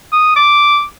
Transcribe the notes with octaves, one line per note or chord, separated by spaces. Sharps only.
D#6
D6